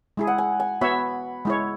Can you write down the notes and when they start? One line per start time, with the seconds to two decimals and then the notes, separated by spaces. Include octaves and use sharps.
0.17 G#3 E4 G#4
0.27 F#5
0.38 G#5
0.60 G#5
0.81 B3 F#4 C#5 E5 B5
1.45 G#3 E4 C#5